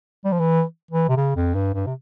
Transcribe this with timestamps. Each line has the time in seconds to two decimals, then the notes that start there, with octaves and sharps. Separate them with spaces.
0.25 G3
0.32 F3
0.40 E3
0.91 E3
1.09 C3
1.17 C#3
1.36 F2
1.55 G2
1.74 G2
1.87 C3